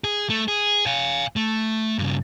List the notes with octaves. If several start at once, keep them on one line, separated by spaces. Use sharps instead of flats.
G#4
A3
G#4
F5 G#5
A3
G2 C#3